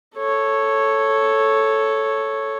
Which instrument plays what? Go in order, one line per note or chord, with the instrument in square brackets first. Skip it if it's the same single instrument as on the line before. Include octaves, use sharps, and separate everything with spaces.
[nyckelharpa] A4 C#5